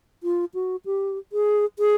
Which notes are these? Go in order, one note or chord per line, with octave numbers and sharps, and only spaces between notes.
F4
F#4
G4
G#4
G#4